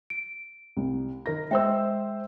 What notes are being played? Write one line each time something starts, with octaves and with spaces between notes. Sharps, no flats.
D7
C2
D#3 A#4 A#6
G#3 C5 E5 G5 E6